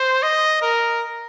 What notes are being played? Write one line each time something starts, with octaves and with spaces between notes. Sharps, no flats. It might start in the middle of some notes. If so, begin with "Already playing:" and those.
Already playing: C5
D#5
A#4